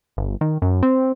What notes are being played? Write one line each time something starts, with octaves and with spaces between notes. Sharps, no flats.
G1
D#3
F#2
C4